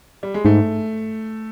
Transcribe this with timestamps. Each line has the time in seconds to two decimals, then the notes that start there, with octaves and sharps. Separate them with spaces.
0.23 G3
0.34 G#3
0.45 G#2 A3